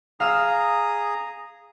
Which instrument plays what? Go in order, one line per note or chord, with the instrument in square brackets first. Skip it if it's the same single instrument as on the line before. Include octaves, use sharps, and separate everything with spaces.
[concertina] G#4 A#5 D#6 [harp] F5 E6